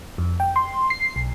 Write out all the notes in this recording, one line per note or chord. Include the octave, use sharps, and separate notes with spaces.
F2
G5
C6
C7
B1